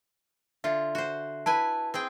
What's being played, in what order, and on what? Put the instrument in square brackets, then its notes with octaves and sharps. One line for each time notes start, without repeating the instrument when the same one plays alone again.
[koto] D3 F4 [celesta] E5
[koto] F#4 C5
[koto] E4 B4 G#5 [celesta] A5
[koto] C4 G#4 G5